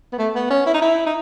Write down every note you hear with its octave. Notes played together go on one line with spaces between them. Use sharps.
B3
A3
B3
C#4
E4
D#4
E4
D#4